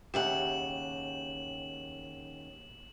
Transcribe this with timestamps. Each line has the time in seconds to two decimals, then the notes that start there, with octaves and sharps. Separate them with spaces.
0.14 D#2 C#3 G4 E5 F#5 G5 E7 F#7